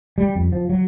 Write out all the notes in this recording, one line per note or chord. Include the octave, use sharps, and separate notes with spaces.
G3
F2
F3
F#3